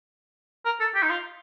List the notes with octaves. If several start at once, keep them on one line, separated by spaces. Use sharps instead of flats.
A#4
A4
G4
D#4
F4